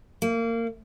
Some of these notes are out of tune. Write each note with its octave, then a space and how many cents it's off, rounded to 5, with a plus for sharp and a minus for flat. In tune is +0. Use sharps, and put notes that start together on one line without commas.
A#3 -25